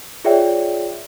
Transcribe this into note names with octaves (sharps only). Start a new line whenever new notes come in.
F4 G#4 C#5 D5 E5 G5